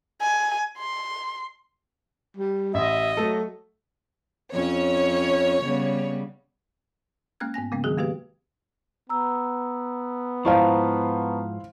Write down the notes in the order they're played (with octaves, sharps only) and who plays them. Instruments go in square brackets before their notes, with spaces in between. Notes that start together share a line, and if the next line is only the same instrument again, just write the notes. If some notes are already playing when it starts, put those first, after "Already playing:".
[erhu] G#5
C6
[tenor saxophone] G3
[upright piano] A1 [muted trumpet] D#5 [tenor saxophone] E5
[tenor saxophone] F#3 [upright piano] A3 A4
[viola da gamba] F2 C#4 [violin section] C#5
[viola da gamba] C#3 G3 B3
[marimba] G#3 A#3 C#4 F6 F#6 G#6
G#2 B3 G#5 A#6
C#3 G#3 A#3 B3 C#4
D#3 F#3 C4 F#4 G#4
G#3 A#3 F#4 G4 B4 F5
[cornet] B3 [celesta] A#5 E6
[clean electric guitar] G#2 F3 [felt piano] E4 C5 F5 [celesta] A5 A#5 C#6